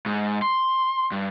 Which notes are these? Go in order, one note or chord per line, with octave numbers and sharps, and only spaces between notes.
G#2
C6
G2